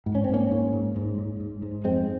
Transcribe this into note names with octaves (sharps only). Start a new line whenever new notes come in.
G#2
C#4
C4
G#2 A#3 C#4
G#2
G#2
G#2
G#2
G#2
G#2
F2 G#3 C4